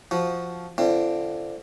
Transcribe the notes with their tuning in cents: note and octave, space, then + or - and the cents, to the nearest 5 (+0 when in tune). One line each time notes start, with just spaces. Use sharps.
F3 +0 F#4 +0
D3 +0 C4 +0 F4 -45